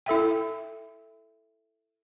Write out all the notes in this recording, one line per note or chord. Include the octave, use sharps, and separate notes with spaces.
E4 A4 E5 G5